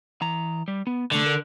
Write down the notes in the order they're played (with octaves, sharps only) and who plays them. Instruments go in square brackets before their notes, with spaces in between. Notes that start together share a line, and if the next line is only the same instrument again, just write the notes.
[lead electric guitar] E3 A#5
G3
B3
[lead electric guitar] C2 A3 [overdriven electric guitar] D3
[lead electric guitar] A#4